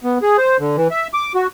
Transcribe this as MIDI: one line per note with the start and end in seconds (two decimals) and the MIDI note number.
0.04 0.18 59
0.22 0.37 68
0.38 0.57 72
0.60 0.76 50
0.77 0.88 52
0.91 1.07 76
1.14 1.33 86
1.35 1.47 66